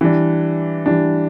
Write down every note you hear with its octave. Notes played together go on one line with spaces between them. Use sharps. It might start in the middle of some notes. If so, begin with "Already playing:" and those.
E3 G3 D4
E3 G3 D4